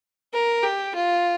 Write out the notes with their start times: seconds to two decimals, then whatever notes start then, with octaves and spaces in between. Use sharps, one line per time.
0.33 A#4
0.63 G4
0.95 F4